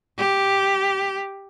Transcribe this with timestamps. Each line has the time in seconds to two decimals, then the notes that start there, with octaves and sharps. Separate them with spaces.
0.18 G4